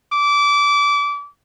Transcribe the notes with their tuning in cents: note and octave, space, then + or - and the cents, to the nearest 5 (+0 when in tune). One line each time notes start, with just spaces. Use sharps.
D6 -25